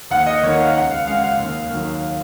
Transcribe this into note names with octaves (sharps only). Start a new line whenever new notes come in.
D#2 F#5
D#5
D#3 A#3 C#5
F5
C#2 F#5
F5
C#3 G#3 F5
F5
D#2
D#3 F#3